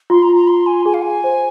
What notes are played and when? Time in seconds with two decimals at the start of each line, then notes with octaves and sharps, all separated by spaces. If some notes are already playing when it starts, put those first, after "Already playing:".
0.10 F4 C6
0.22 A#5
0.35 A#5
0.48 C6
0.66 G#5
0.85 G#4 G#5
0.94 F5
1.02 G#5
1.24 C5